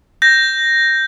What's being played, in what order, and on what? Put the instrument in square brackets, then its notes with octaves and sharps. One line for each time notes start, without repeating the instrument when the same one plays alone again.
[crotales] G6 A#6